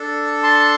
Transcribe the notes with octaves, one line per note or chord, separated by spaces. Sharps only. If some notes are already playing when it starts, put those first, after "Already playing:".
Already playing: D4 A4
A5 C6